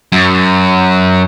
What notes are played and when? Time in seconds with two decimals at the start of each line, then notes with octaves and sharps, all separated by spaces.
0.12 F#2